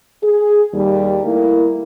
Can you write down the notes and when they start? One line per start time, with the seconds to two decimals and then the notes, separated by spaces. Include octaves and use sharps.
0.23 G#4
0.73 D#2 G3
1.25 A3 A#3 E4